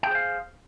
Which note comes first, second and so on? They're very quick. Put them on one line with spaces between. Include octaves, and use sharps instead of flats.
G5 G#4 C5 F5